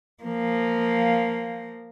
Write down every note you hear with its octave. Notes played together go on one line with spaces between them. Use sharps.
F3 A#3